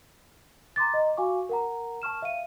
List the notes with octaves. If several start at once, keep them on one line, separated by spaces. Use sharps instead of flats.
A#5 C6 D6 A6
D#5 A#5
F#4 F5 G#5 C#6 D6
A#4 F#5 A#5
A5 C#6 F6 E7
E5 F5 D#7